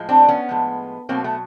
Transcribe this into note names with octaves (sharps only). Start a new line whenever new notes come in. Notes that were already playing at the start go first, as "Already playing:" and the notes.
Already playing: A2 F3 G#3
C4 D4
B3 C#4
A2 F3 G#3
B2 F#3 A3 A#3 C4
A3 B3